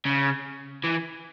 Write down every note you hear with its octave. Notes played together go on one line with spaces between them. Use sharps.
C#3
E3